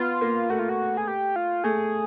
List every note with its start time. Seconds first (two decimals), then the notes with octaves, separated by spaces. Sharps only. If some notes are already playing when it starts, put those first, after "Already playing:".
Already playing: B3 F4
0.21 A#3
0.50 A3 F#4
0.59 F4
0.69 F#4
0.97 G#4
1.08 G4
1.36 F4
1.64 A3 G#4